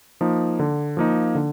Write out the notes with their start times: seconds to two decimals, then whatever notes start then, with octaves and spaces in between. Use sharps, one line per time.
0.21 F3 A#3 D#4
0.59 D3
0.97 F3 A#3 D#4
1.35 D3